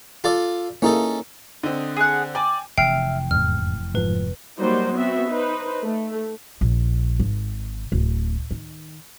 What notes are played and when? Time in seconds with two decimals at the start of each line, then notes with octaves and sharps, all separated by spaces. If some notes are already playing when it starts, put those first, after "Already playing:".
0.24 F4 A4 D5
0.82 A#3 C#4 D#4 E4 G#4 A4
1.63 D3 C4 D#5
1.96 G#4 F#5
2.35 D5 G5 G#5
2.78 F1 C3 E3 E5 G5 F6 C7
3.31 E2 G#2 F6
3.95 G#2 F3 B4
4.58 F#3 G3 A#3 D#4 C5
4.94 B3 C4 F#4 E5
5.29 D#4 B4 C5
5.83 A3
6.61 A#1
7.19 G#1
7.92 D1
8.51 D#3